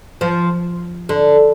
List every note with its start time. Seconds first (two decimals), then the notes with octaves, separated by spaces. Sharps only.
0.21 F3
1.09 D3